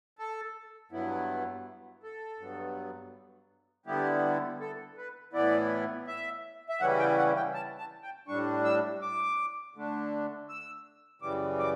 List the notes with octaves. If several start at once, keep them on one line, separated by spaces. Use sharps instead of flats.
A4
G2 F#3 B3 E4
A4
G2 F#3 B3
D3 G3 B3 E4 G4
A4
B4
A2 E3 B3 E4 D5
E5
E5
C#3 E3 G3 C#4 E4 F#5
G5
F#5
G5
A5
A5
G5
A2 G3 D4 C#6
E6
D6
D3 A3 D4
E6
F#2 C#3 E3 G3 D6
D6